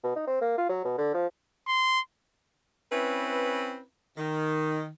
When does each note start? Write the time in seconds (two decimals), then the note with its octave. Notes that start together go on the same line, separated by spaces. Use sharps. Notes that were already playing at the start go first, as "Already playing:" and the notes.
0.03 B2
0.16 D#4
0.27 C4
0.41 A#3
0.58 F4
0.69 F#3
0.85 B2
0.98 D3
1.14 F3
1.68 C6
2.92 C4 C#4 E4 B4
4.17 D#3